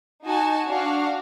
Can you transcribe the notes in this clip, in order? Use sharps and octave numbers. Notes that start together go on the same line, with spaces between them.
D#4 F#4 G#5 A5
D4 F#4 F5